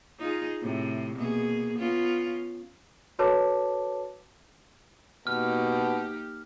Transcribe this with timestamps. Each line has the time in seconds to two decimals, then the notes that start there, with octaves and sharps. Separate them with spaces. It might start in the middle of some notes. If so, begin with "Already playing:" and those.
0.20 D#4 F4 G#4
0.61 A2 C3
1.16 B2 A#3 G#4
1.78 B3 C#4 F4
3.19 F#4 A4 B4 C#5 A5 D6
5.27 B2 A#3 D#4 G4 F6